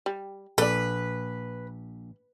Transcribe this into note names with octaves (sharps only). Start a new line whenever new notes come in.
G3
A#1 A4 B4 D5